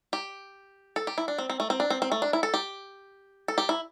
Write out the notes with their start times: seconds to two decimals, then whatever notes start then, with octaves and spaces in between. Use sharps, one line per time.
0.13 G4
0.96 A4
1.07 G4
1.18 E4
1.28 D4
1.38 C4
1.50 C4
1.60 A3
1.70 C4
1.80 D4
1.90 C4
2.02 C4
2.12 A3
2.22 D4
2.33 E4
2.43 A4
2.54 G4
3.48 A4
3.58 G4
3.69 E4